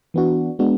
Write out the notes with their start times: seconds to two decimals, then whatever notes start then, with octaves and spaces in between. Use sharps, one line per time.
0.14 E3 B3 D4 F#4
0.59 G#3 B3 D4 F#4